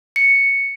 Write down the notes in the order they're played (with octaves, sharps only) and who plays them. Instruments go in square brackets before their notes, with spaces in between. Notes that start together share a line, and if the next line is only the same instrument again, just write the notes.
[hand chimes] C#7